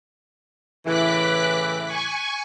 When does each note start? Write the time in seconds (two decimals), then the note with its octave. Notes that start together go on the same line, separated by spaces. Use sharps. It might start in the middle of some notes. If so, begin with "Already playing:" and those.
0.87 A2 C#3 E3 D6 F#6 B6
1.86 G#5 C#6